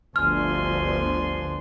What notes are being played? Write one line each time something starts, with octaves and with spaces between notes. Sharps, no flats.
G1 D2 F3 D4 G#5 C6 F6